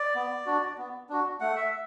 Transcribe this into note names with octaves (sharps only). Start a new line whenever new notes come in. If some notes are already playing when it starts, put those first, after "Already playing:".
Already playing: D5
B3
D4 F#4
B3
D4 F#4
A3 F#5
E5